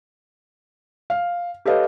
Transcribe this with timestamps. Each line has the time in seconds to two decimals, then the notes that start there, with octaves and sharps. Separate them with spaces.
1.10 F5
1.65 G4 A4 B4 C#5 D#5 F5